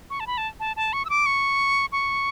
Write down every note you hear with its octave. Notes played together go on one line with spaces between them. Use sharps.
C#6
A5
B5
A5
A5
A5
C#6
E6
D6
C#6
C#6